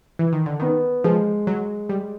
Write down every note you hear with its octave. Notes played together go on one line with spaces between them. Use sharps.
E3
D#3
D3
D#3 B3
F3 G#3
F#3
G3